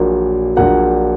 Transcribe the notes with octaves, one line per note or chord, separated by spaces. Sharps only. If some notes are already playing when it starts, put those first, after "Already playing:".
Already playing: A#1 A#2 F#3 A#3
A#1 A#2 F#3 A#3 F#5